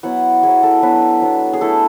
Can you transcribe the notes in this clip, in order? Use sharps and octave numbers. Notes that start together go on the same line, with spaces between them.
F#3 B3 E4 F#5
F#3 B3 E4 G#4
A4
F#3 B3 D4 B4
F#3 B3 D4
G#4
A3 E4 A4